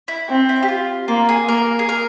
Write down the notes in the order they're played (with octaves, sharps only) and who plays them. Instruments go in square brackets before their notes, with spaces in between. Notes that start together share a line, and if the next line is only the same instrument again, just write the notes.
[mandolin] E4
[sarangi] C4
[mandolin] E4
G4
F4
[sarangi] A#3 [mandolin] F4
[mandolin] G#4
[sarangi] A#3 [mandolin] A#4
[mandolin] G#4
A#4